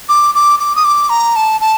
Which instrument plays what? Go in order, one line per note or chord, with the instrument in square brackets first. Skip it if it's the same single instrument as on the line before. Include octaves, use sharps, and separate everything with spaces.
[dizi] D6
D6
D6
D#6
D6
A#5
A5
A5